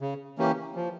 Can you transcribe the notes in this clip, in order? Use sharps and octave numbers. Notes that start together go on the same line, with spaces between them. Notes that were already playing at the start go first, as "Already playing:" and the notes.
C#3
E3 A#3 C#4 G4
F3